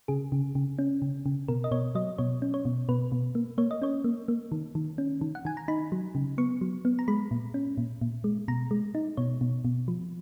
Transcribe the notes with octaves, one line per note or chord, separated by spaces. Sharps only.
C#3 G#4
C#3
C#3
C#4
C#3
C#3
B2 A#4
D#5
B2 C#5
F#3 D#5
B2 C#5
C#4
C#5
B2
B2 B4
B2
A#3
A#3 C#5
D#5
C#4 C#5
A#3
A#3
D#3
D#3
C#4
D#3
F#5
D#3 G#5
A#5
D#4 B5
F#3
C#3
B3 C#6
F#3
B3
A#5
G#3 B5
A#2
C#4
A#2
A#2
G#3
B2 A#5
G#3
D#4
B2 C#5
B2
B2
F3